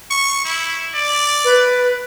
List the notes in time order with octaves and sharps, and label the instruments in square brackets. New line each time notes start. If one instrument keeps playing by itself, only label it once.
[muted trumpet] C#6
E4
D5
[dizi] B4